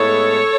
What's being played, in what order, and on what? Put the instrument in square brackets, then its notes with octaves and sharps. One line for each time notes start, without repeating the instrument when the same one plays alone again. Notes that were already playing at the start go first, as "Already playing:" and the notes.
Already playing: [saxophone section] A2 G#3 B3 E4 A4 C#5